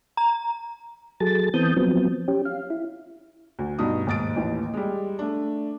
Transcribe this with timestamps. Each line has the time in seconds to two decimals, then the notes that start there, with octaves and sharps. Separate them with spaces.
0.17 A#5
1.20 F#3 G#4 A4 A6
1.54 E3 B3 C4 A5 D#6 G6
1.77 F3 F#3 B3 C4
2.28 C#4 G4
2.45 F5
2.70 E4
3.59 D2
3.79 G2 B2 D#4 D#6
4.07 D#2 G#2 D#6 A6 D7
4.36 A1 D#2 E3
4.73 G3 G#3
5.19 A3 D4